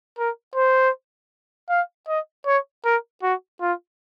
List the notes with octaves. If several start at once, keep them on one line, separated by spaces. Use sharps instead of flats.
A#4
C5
F5
D#5
C#5
A#4
F#4
F4